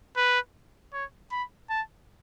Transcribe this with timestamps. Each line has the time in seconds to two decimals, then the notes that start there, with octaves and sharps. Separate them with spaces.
0.17 B4
0.93 C#5
1.32 B5
1.70 A5